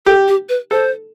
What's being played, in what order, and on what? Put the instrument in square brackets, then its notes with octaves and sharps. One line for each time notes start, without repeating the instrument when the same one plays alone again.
[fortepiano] G4 [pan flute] A4
[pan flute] G4
B4
[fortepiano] A4 [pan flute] C5